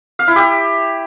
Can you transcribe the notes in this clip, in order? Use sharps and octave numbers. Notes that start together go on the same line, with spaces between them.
F5
E4
G4